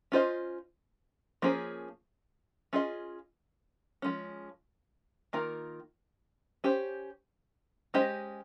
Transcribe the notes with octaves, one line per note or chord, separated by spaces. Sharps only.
C#4 F4 C5 D#5
F3 A#3 C#4 G#4 C5
C#4 F4 G#4 D#5
F3 G#3 C#4
D#3 A#3 F4 A#4
C#4 G4 C5
G#3 C#4 G4 C5 D#5